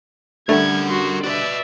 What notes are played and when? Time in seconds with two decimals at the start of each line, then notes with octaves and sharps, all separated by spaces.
0.49 D3 G3 A3 A#4 F#5 G#6
0.89 F#4 C6
1.24 F#4 B4 D5 E5